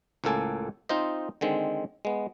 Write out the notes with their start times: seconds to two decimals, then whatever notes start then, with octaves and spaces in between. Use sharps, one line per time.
0.24 C#2 A2 A#3 A4 G#5
0.89 C4 D#4 F4 C5 D#5
1.41 D3 D#3 G#3 C4
2.05 G#3 B3